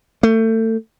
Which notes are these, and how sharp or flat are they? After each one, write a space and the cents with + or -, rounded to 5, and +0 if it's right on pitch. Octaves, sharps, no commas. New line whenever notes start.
A3 +30